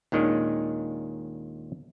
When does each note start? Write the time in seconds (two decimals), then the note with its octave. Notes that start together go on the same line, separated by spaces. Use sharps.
0.12 D#2 A#2 D#3 G#3 C#4 D4